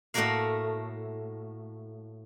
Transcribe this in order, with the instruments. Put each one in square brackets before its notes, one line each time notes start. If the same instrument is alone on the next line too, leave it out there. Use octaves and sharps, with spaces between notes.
[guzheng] A2 A3 A#3 F#4 A#4 F5